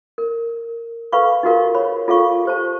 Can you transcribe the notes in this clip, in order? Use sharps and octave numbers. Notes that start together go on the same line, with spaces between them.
A#4
A4 B4 F5 B5 C#6
D#4 F4 F#4 G#4 A#4 F5
C#5 B5
F4 A4 F5 C#6
G4 C5 A5